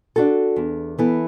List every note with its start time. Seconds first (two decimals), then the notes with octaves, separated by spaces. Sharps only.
0.16 D4 F#4 A4
0.56 E2
0.99 E3 B3 E4 A4